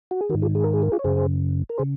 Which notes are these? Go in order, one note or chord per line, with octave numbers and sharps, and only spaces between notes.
F#4
G#4
G#2 D#3 F#4 A#4
F4 G#4
G#4
A#4
G#4
A#4
F4 G#4
C#5
F#2 C#3 G#4 C5
A#4
C#3 G#4 C5